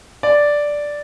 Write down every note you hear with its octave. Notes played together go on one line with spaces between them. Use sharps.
D5